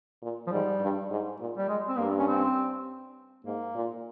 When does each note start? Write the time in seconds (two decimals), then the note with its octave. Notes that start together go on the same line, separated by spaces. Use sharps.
0.22 A#2
0.47 F3
0.52 G#2 G3
0.81 G2
1.11 G#2
1.40 A#2
1.57 G3
1.69 G#3
1.89 C4
1.98 G2 A#3
2.19 C#4
2.28 C4
3.45 G#2 A#3
3.75 A#2